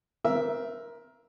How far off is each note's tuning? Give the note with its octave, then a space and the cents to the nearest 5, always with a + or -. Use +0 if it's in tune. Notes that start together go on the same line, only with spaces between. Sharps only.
C4 -35 A#4 +20 E5 +0